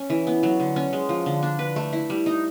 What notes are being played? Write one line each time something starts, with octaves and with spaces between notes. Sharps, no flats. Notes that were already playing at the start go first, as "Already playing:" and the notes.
Already playing: C#4
E3
B3
F#3
D3
C#4
G#3
F3
D3
D4
B4
A3
E4
G3
D#4